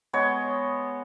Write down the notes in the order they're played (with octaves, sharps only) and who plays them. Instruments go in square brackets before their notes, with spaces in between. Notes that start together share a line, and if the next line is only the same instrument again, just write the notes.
[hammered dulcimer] G#3 B3 C#5 D#5